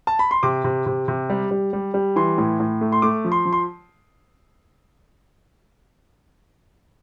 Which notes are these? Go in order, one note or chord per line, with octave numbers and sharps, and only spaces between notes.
A5
B5
C6
C3 D6
C3
C3
C3
G3
G3
G3
G3
E3 C6
A2
A2
A3
C6
A3 D6
F3
C6
F3
C6